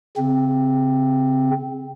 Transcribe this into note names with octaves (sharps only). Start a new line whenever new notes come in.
C#3 C4